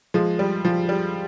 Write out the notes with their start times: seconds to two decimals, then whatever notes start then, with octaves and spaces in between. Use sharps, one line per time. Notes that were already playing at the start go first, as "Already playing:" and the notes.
0.14 F3 G#3
0.39 G3
0.65 F3
0.89 G3